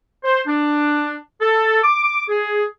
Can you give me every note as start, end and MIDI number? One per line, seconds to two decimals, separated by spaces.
0.24 0.40 72
0.47 1.14 62
1.40 1.79 69
1.83 2.22 86
2.28 2.63 68